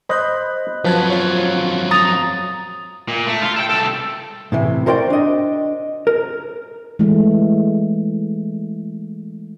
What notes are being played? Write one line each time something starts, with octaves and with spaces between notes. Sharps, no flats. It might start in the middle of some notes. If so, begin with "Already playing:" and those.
C5 D#5 B5 F#6 G6
F2 F3 F#3 B4 A5 F#6 G#6
F4 C#5
A#5 D#6 A6
A#2
A3
F4
A4 G5
C2 A4
A2 C3 E3
F#4 A#4 C5 D5 F#5 G5
D4 D#5
A#4
E3 G#3 A3